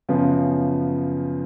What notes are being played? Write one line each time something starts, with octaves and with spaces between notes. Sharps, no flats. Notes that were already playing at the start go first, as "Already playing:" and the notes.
F#2 C#3 F3 B3